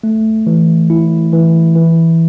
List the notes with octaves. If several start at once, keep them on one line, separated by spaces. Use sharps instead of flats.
A3
E3
E4
E3
E3